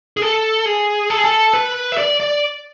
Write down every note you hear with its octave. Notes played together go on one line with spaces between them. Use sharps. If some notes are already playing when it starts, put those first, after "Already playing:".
G#4
A4
G#4
A4
G#4
A4
B4
E5
D5
D5